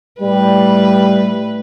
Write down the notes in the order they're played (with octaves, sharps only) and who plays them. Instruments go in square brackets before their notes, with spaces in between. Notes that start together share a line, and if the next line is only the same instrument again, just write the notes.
[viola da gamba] A2 B4 [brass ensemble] G3